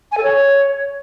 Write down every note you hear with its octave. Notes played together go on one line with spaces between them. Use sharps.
G#5
A4
C#5